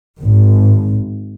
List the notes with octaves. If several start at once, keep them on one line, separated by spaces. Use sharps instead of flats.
G#1